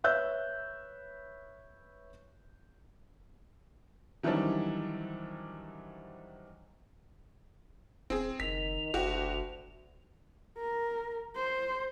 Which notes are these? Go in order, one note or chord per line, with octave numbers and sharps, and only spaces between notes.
B4 C#5 E5 E6 F#6 G6
D#3 E3 F#3 G3 C4 D4
D#1 C4 G#4
F#1 D#3 B6 F7
F#1 D2 F#4 G4
A#4
C5